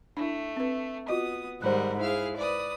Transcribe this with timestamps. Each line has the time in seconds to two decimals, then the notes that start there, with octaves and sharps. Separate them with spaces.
0.17 A3 D4 E4
0.56 C4 B4
1.09 B3 F4 F#4 D#5 D#6
1.62 G#2 D#3 G3 A#4 C5 F#5 B5 F#6
2.01 E4 G#4 F5 F6
2.38 B4 D5 D#6